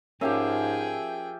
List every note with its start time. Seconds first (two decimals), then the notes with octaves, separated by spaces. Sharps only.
0.21 G#2 F3 A#3 C#4 G4 G#4 E5 G5